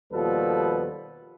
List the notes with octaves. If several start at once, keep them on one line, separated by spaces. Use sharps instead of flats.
D#2 B2 F3 G3 A4 B4